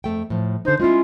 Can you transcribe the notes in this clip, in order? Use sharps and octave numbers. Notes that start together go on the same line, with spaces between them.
F2 A3 G5
A2 F3
D3 D#4 C5
G#3 C#4 E4 F4